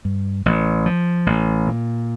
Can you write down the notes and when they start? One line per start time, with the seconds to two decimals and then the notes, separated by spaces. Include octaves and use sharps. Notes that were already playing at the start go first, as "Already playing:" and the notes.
0.05 G2
0.46 A1
0.86 F3
1.26 A1
1.67 A#2